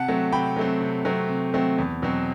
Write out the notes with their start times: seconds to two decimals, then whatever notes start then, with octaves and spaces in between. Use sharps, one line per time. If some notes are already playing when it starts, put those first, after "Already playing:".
Already playing: C3 F#5 A5
0.08 F#3 A3 C4
0.32 C3 G5 B5
0.56 F#3 A3 C4
0.81 C3
1.05 F#3 A3 C4
1.29 C3
1.54 F#3 A3 C4
1.78 E2
2.02 B2 F#3 C4